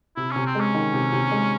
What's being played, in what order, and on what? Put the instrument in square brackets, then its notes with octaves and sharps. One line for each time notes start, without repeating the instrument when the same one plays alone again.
[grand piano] C3 [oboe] E4
[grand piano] C3 [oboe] C#4
[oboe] C4
[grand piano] G#3
[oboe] C#4
[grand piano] D#3
C3
C3
G#3